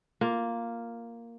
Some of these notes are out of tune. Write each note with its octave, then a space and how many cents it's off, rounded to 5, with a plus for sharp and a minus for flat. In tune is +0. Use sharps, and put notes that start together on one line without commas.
A#3 +0 F4 +0